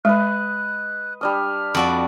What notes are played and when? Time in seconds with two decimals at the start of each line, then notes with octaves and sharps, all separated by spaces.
0.05 G#3 B4 D#5 F#6
1.21 G3 D4 D#6 F6
1.75 F2 F#4 D5